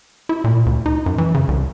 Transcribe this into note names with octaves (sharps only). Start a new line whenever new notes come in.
E4
A#2
D2
D#4
F#2
E3
C#3
C2